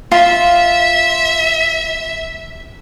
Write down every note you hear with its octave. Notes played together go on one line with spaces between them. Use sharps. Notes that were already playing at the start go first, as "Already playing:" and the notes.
F4 E5 C6